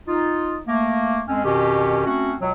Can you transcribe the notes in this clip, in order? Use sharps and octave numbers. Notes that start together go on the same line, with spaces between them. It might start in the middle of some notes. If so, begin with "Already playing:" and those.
D#4 F4
A3 A#3
F2 G#3 C4 C#4
F2 B2 D#3 C#4 G4
A3 C4 C#4 F#4
C#2 B2 F#3